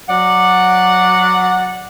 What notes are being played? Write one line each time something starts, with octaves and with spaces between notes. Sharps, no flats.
F#3 D5 F#5